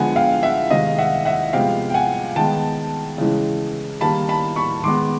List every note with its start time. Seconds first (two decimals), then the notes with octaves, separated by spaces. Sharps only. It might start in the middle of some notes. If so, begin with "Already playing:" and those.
Already playing: D3 F3 G#3 B3 F#5 G#5
0.16 F5 G5
0.43 E5 F#5
0.70 C3 D#3 G#3 D#5 F5
0.98 E5 F#5
1.25 E5 F#5
1.53 C3 F3 G#3 B3 F5 G5
1.90 G5
1.94 F#5 G#5
2.36 D#3 G#3 B3 G5 A5
3.18 C#3 E3 G#3
4.01 D#3 G3 A#3 A5 B5
4.29 A5 B5
4.56 B5 C#6
4.84 D#3 G#3 B3 C6 D6